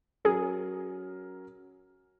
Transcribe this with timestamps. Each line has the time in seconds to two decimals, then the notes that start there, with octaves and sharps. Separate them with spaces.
0.25 F#3 C#4 G#4 A#4